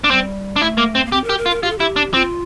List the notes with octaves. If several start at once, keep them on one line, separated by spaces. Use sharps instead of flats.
D4
G3 C4
D4
A3 E4
A#3
C4
A#3
C4 G4
A#4
G4
A#4
F4
A#4
F4 G4
A4
E4 G4
D4
C4 F4